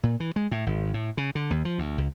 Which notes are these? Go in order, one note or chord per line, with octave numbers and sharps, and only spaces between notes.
A#2
E3
G#3
A2
G#1
A2
C#3
D3
D#2
F3
D2
C#2